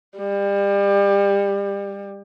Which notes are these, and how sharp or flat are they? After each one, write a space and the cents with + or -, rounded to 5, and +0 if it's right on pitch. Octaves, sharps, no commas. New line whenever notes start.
G3 +30